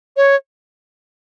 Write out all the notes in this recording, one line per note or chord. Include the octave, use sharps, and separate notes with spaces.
C#5